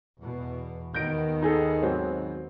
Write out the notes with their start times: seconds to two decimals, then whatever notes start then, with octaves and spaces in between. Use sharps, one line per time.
0.21 E2 B2
0.94 D#2 D#3 B3 G6 A#6 D7
1.42 D#4 G#4 A4
1.83 G#2 F#3 C4